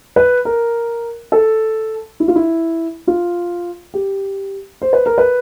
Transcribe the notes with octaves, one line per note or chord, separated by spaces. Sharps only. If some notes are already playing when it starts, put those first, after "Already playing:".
B4
A#4
A4
E4
F4
E4
F4
G4
C5
B4
A#4
B4